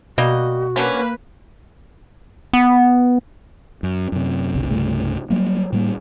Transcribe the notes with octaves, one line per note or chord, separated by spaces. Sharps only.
B2 G3 A#3 F#4 D#5
D3 F#3 A#3 C#4 B4
B3
F#2
F#2 C3
F#1 C2 B2 D3
C2 G2 C#3 A3
F#3 G3 A#3
A2 G3 A#3